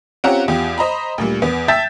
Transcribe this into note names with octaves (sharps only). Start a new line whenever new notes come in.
C4 C#4 F4 G4 F#5 A#5
E2 F4 G4
C5 D#5 A#5 B5
D2 A#2 G3
E2 B3
E5 G5 A5 G6 A6 B6